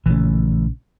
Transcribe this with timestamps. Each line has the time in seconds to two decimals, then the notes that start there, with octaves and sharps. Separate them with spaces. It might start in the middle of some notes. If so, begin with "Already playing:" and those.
0.06 A#1 C#3 E3 A3